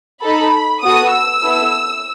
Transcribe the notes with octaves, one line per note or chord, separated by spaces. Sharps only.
D#4 A4 B5
B3 F#4 A4 D#6
E6
B3 E4 A4